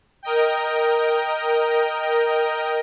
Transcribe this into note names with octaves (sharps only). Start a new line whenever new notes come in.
A#4 D#5 G5